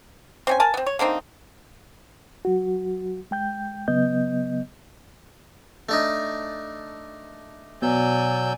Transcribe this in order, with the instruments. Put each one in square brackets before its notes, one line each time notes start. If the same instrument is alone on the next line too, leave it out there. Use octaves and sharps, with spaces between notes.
[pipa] C4 C#4 G#5
A#4 G#5 A5
B3 C4
C#5
D3 A#3 C4 D#4
[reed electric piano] F#3 F#4
G#3 G5 G6
C#3 F#3 B3 D#5 G6
[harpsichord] A3 D4 D#4
[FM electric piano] B2 [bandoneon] F#3 E6 G6 [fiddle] D5 G#5